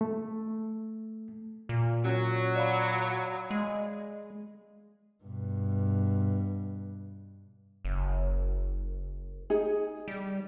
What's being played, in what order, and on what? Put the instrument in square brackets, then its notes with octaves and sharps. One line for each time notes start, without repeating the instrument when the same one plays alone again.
[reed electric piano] A3
[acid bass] A#2
[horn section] F#3 [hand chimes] C#4 F#4
[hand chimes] D5 F5 B5
[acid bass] G#3
[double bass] G2 B2
[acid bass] F#1
[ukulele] D#4 G#4
[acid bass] G3